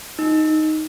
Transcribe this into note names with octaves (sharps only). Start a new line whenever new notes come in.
D#4